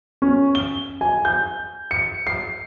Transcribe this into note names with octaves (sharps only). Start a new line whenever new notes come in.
C#4
G7
G#5
G6
C#7
C7